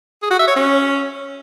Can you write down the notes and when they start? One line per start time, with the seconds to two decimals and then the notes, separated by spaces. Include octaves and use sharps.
0.22 G#4
0.31 F#4
0.39 E5
0.48 C#5
0.56 C#4